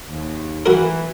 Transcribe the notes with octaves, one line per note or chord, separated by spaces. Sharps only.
D#2
E3 F#4 A#4